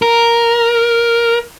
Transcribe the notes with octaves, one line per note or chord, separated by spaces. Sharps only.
A#4